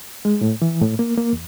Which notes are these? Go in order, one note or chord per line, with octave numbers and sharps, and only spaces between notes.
G#3
A2
E3
A2
A#3
A#3
E2